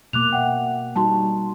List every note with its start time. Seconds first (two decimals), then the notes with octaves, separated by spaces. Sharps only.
0.13 B2 A#3 D6 F#6 F7
0.33 E5 F#5 G5
0.96 G3 D#4 F#4 A5 C6